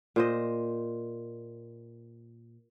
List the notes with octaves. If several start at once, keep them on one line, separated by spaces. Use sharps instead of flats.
A#2 C5 D#5